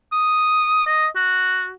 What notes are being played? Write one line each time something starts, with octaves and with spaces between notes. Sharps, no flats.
D#6
D#5
F#4